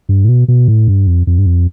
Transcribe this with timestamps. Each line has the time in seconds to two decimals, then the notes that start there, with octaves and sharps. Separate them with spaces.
0.09 G2
0.25 A2
0.29 B2
0.48 B2
0.68 A2
0.88 G2
1.07 F2
1.27 F2
1.38 G2
1.46 F2